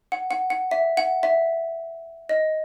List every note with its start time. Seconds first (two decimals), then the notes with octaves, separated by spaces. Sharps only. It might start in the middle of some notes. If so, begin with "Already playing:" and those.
0.12 F#5
0.31 F#5
0.50 F#5
0.71 E5
0.97 F#5
1.23 E5
2.29 D#5